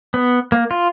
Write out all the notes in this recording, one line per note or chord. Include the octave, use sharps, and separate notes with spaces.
B3
A#3
F4